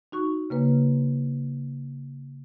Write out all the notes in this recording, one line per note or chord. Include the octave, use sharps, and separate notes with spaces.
D#4 F#4 C#6
C#3 A#3 B4